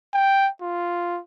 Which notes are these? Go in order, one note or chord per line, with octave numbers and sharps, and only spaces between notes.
G5
F4